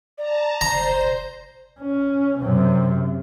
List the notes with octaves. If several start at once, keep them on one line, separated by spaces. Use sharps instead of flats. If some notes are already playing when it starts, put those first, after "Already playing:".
D5 A5 A#5
F#1 C5 A#5
C#4
F#2 C3